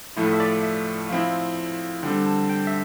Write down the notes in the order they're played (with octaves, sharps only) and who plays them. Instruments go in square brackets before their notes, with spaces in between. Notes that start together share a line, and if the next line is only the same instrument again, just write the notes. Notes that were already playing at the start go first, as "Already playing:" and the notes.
[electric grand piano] A2 F3 A3 [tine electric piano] E4
[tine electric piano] E5
D5
E5
[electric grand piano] F3 C4 E4 [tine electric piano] F5
[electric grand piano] D3 G3 C4 [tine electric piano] G5
[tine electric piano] A5
G5
E5